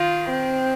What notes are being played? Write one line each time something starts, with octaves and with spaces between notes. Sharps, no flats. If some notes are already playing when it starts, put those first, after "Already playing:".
Already playing: D#3 F4
C4